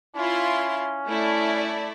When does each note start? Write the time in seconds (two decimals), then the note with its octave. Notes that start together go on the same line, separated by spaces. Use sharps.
0.16 C#4 E4 F4 C6
1.08 A3 E4 D5